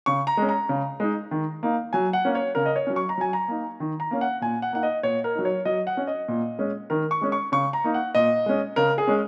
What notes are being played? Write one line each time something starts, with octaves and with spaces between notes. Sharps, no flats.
C#3 C#6
A#5
G#3 C#4
A#5
C#3
G#3 D#4
D#3
A#3 D#4
F#3 G#5
F#5
A#3 C#4
C#5
C#3 A#4
D#5
C#5
F#3 C#4
C#6
A#5
F#3 G#5
A#5
A#3 D#4
D#3
A#5
A#3 C#4
F#5
A#2 G#5
F#5
A#3 D#4 F#5
D#5
A#2 C#5
A#4
F#3 D#4
C#5
F#3 D#5
F#5
C#4
D#5
A#2
G#3 C#4
D#3 A#4
C#6
G#3 C#4
C#6
C#3 C#6
A#5
A#3 D#4
F#5
A#2 D#5
G#3 C#4
C#3 A#4
G#4
G#3 C#4